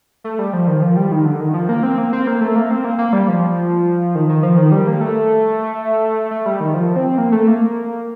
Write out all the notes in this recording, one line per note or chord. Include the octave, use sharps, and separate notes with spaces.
A3
G3
F3
D#3
F3
G3
D#3
D3
D#3
F3
A#3
C4
A#3
C4
A#3
A3
A#3
C4
A#3
A#3
G3
F3
D#3
D#3
F3
D#3
G3
A#3
A3
A3
G3
D#3
F3
C4
A#3
A3
A#3